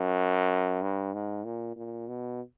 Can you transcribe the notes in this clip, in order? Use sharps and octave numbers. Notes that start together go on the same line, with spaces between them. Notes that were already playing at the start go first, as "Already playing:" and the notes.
Already playing: F#2
G2
G#2
A#2
A#2
B2